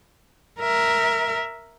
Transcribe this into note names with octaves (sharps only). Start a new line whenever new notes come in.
A#4 E5